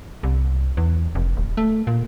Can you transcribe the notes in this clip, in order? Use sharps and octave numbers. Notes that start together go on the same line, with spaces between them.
C2
E2
F1
D1
A3
A#2